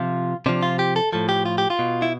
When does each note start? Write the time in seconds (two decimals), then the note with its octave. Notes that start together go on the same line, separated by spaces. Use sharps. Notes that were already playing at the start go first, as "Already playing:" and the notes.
Already playing: C3 F3 F4
0.46 C3 F3 D4
0.63 F4
0.79 G4
0.96 A4
1.13 A2 F3 A4
1.29 G4
1.46 F4
1.58 G4
1.70 F4
1.79 B2
2.02 E4